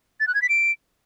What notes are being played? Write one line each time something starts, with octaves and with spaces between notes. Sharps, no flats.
A6
F#6
G#6
B6
D7